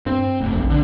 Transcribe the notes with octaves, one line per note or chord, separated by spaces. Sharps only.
G2 C4
F1
A#1
D3 D4